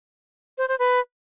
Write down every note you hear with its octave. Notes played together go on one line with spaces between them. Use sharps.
C5
C5
B4